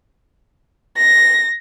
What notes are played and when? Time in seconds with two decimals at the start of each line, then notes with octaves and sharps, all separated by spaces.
0.96 A#6